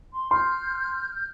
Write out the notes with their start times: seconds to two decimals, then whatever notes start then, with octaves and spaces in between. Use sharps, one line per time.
0.12 C6
0.31 C6 F6 G6